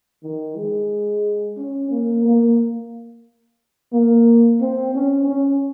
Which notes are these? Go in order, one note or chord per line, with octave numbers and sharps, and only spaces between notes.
D#3
G#3
C#4
A#3
A#3
A#3
C4
C#4
C#4